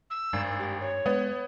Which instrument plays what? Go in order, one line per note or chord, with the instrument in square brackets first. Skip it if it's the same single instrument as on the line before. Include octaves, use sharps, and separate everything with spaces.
[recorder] E6
[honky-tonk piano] G#1 [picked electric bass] G2
[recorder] G4
C#5
[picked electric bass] G#3 [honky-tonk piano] B3